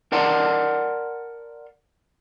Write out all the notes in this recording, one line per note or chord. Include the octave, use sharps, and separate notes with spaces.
A#4 D5 F#5 A5 C6